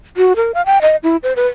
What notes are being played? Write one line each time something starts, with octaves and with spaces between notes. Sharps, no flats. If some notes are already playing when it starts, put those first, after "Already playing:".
F#4
A#4
F5
G5
D#5
E4
C5
B4